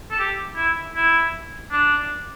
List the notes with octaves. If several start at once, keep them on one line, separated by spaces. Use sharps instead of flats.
A4
G4
E4
E4
D4